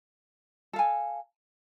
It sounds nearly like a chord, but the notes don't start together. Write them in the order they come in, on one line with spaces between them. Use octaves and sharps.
A4 F5 G#5